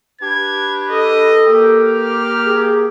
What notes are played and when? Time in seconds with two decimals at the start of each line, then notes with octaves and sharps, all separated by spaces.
0.21 D4 G4 B4 G#6
0.90 A4 D#5
1.46 A#3 G4
1.83 F6
2.47 G#4